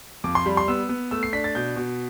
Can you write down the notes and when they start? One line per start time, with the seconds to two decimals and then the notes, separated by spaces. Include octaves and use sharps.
0.24 F2 D6
0.35 C6
0.46 G3 B5
0.57 C6
0.68 B3 E6
0.89 B3
1.11 A3 E6
1.23 C7
1.33 D4 B6
1.44 A6
1.55 B2 G6
1.76 B2